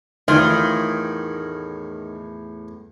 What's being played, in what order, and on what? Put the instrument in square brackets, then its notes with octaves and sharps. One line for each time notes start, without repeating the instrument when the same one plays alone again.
[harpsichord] E2 A2 G#5 [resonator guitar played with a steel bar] D#3 [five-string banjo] F4